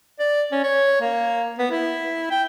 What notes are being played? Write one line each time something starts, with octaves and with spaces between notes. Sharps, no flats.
D5
C#4
C#5
A#3
B3
E4
G5